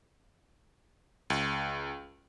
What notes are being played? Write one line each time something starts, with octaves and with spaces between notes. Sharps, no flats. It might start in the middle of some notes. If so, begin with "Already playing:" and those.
C#2